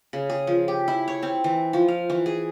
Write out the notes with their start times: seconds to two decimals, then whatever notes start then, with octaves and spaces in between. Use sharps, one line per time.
0.13 C#3
0.30 G#4
0.47 F3
0.68 G4
0.88 E4
1.08 C#5
1.23 C4
1.44 E3
1.73 F3
1.88 F5
2.10 E3
2.26 G#4